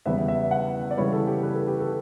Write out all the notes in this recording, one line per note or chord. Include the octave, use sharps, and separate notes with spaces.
E2 C#3 G3 B3 E5
E5
F#5
D5
C#3 E3 G3 B3 C#5
A4
G4
B4
A4
G4
A4